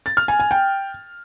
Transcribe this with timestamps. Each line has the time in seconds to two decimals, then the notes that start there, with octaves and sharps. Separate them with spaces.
0.06 A6
0.17 F6
0.28 G#5
0.40 G#5
0.51 G5